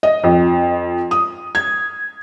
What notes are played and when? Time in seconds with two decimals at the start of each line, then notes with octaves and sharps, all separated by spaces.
0.03 D#5
0.23 F2
1.11 D#6
1.55 G#6